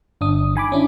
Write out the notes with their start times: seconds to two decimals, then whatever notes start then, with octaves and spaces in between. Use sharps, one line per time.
0.21 G1 D4 D#6
0.55 D#3 G#5 B5 D6
0.72 C#4 D4 E4